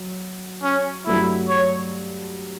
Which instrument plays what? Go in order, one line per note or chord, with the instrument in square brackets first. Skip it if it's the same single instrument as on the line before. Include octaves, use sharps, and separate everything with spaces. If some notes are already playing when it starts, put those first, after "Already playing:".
Already playing: [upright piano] F#3
[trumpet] C#4
[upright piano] G2 F#3 A3 [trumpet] E4
[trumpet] C#5